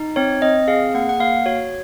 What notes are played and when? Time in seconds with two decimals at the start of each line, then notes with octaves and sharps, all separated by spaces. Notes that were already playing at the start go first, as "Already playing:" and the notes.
Already playing: D#4
0.16 C4 C#5
0.42 C4 D#5
0.68 G#4 F5
0.94 A#3 F#5
1.09 F#5
1.20 A#3 F5
1.46 F#4 C#5